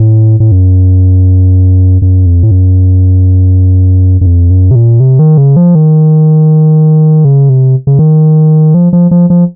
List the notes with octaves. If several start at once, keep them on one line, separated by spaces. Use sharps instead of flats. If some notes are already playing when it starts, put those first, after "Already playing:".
Already playing: A2
A2
F#2
F#2
F2
A2
F#2
F#2
F2
F#2
C3
A#2
C3
D#3
C#3
F3
D#3
C#3
C3
C#3
D#3
F3
F3
F3
F3